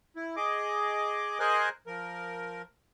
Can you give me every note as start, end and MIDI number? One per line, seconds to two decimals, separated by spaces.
0.16 0.36 64
0.36 1.39 68
0.36 1.39 75
0.36 1.39 86
1.40 1.69 68
1.40 1.69 70
1.40 1.69 72
1.40 1.69 75
1.40 1.69 80
1.40 1.69 90
1.87 2.62 53
1.87 2.62 70